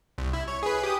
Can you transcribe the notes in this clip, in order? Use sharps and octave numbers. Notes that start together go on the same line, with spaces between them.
C2
E4
C#5
G#4 B4
G4 D#6